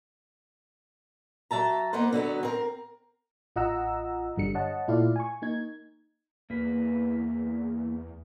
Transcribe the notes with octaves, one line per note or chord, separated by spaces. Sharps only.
F#3 E5 A5 A#5
A#3 B3 D#4 B4 C5
D3 F#3 B3 F#4
C4 A#4
A1 F4 D#5 F#5 A#5 E6
G1 G2 D3 G3 C#7
C#5 D#5 F#5 A5
A#2 A3 E4 F4 D5 F5
G#5 C#6
A#3 D#4 G#6
E2 A#3 B4